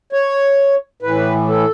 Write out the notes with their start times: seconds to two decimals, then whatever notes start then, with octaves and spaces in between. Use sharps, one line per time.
0.13 C#5
1.03 A2 E3 B4
1.48 A4